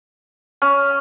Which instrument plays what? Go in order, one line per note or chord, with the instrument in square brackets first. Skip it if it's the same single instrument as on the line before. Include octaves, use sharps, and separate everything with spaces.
[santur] C#4